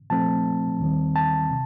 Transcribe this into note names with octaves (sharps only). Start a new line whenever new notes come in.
A#2 F3 A3 C4 A5
D#2 D#3 G3 C4
A5
C3